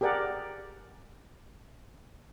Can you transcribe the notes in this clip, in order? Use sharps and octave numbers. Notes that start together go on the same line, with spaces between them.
G4 G#4 A#4 D5 F#5